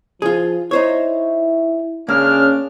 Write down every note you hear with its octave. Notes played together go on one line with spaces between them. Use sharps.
F3 F4 G#4
D#4 E4 C5 C#5
C#3 A#3 C#4 D4 F6